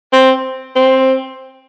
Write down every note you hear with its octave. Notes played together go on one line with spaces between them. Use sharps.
C4
C4